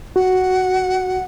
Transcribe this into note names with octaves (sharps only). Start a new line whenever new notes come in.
F#4 F#5